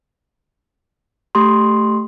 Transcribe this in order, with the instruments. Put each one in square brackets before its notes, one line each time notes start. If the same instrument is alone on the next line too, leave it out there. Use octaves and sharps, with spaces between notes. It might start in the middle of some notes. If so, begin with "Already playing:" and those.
[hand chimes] A3 G4 C6